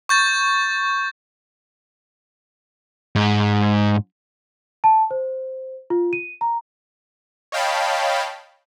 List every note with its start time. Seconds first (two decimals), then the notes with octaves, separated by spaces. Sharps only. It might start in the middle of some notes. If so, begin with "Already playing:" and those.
0.09 C#6 G6 A6
3.16 G#2
4.84 A5
5.11 C5
5.90 F4
6.13 D#7
6.41 A#5
7.52 C#5 D#5 F5 G5 A5 B5